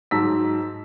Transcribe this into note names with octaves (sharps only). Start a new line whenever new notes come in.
G#2 F#3 A5 A#5 E6 B6